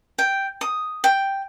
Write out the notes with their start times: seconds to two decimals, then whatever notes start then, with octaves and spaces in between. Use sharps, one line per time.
0.18 G5
0.61 D#6
1.04 G5